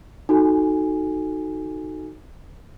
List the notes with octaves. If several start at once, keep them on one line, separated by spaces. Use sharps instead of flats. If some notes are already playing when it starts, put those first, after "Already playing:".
D#4 F#4 A4 G#5